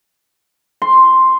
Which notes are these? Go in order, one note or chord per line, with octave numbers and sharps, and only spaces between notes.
C6